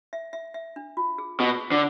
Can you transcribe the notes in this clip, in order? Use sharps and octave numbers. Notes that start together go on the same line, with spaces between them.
E5
E5
E5
D4
F4
G#4
B2 F4
G#4
D3